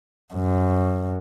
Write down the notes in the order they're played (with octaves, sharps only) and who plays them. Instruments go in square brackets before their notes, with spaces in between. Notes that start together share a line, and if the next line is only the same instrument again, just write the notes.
[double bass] F#2